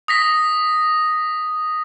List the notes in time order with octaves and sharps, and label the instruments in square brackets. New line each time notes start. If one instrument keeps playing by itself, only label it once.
[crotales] D#6 A#6 B6